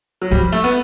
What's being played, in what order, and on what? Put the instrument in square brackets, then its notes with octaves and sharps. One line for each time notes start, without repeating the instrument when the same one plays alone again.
[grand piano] F#3
[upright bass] F3 [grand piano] G3
[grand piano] A3
B3